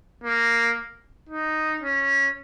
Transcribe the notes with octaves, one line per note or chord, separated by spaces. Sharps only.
A#3
D#4
C#4